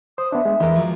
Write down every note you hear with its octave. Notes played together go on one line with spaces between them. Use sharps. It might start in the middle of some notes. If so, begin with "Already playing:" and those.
C5 D#6
B3 D4 E5
G#3
E2 G#2 E3 G#3 G4 A#4
F3 F#3